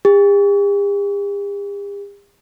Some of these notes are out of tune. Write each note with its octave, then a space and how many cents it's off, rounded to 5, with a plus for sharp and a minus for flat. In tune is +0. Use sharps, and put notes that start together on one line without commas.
G4 +45